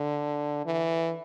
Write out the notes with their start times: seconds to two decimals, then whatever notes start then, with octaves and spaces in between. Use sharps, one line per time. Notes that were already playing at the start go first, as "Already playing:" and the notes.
Already playing: D3
0.66 E3